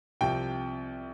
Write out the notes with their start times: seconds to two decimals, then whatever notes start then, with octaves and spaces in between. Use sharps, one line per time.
0.21 C2 C3 F3 G5